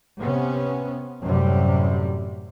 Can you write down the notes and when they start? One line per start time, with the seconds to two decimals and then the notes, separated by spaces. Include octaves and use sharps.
0.20 C3 B3 C#4
1.22 F#2 A2 C3 G3